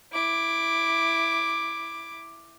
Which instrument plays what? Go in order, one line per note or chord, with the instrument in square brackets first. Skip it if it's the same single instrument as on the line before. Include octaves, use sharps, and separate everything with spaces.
[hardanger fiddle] E4 D6